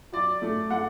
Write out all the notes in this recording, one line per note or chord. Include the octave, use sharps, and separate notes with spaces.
F#3 D5
A3
A3 F#5